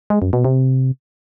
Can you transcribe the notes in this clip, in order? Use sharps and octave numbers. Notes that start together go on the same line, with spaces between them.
G#3
F#2
B2
C3